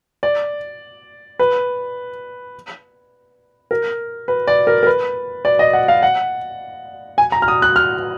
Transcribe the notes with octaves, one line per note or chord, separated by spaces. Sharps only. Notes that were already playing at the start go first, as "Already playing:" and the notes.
D5
B4
A#4
B4
D5
A#4
A#4
B4
D5
D#5
F#5
F5
F#5
G#5
A#5
F6
D#6
F#6
F6